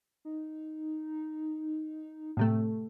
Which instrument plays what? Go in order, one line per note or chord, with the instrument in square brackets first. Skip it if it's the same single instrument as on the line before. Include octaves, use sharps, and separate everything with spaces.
[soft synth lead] D#4
[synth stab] A2 C3 A3